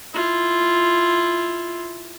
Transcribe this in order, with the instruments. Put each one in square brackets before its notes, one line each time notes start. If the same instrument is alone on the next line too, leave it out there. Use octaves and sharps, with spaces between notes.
[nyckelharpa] E4 F4